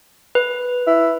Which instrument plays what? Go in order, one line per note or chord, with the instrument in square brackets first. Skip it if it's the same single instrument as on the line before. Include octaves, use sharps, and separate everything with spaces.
[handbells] B4
[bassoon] E4